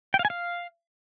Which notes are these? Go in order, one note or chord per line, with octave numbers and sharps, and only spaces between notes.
G5
F5
G#5
F5